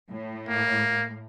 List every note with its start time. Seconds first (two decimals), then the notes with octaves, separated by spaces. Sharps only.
0.11 A2
0.49 A#3